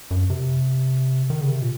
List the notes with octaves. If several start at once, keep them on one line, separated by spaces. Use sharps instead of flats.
F#2
C3
D#3
C#3
C3
A#2